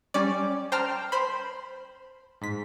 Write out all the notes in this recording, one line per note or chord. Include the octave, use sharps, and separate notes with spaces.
G3 C#4 D5
C5 G5 A5 A#5 F6
C5 B5
G#2 B6